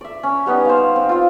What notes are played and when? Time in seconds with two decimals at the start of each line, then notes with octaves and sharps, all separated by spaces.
0.01 D5 E5
0.23 C#4
0.46 G3 B3 C#4 D#4
0.65 C5 F5
0.96 C4
1.09 F4 C5